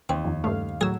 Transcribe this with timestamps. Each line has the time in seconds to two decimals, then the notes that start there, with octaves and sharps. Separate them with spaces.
0.09 D#2 C4
0.24 F2 D#3
0.44 G2 C#3 A3 F5
0.81 A2 F#3 G#4 E6 G#6